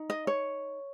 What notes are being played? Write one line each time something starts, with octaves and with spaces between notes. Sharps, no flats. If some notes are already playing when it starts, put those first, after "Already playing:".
Already playing: D#4
D#5
C#5